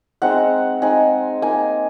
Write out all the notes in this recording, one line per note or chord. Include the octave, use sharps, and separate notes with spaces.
G#3 C4 D#4 F#5
G#3 C4 D#4 G#5
A#3 D#4 G#5